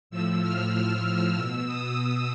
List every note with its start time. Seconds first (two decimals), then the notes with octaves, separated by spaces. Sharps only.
0.10 A2 F3 E6
0.42 F6
0.73 F6
1.36 B2 E6
1.66 D#6
1.98 E6